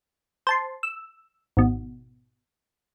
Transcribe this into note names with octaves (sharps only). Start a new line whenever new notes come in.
C5 A5 C6
E6
G#1 B2